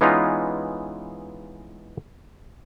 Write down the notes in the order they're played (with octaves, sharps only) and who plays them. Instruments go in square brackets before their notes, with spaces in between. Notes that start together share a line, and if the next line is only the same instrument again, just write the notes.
[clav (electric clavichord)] E3 G#3 B3 C#4 D#4 F4